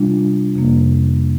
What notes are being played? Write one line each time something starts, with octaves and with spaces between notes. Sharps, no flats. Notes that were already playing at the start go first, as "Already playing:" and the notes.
Already playing: C3 G3 D4 F4
F2 C3 F3 A#3